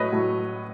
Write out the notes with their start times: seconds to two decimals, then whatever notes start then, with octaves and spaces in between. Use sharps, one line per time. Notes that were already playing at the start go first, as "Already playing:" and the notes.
Already playing: A2 F#3 A3 B4 C#5 D#5
0.12 A2 F#3 A3